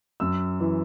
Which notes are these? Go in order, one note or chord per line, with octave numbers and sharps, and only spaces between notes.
F#2 E6
E3